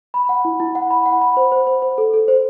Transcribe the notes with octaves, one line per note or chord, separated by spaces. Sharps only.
B5
F#5
E4
E4
F#5
B5
F#5
B5
C5
C5
C5
C5
A4
A4
C5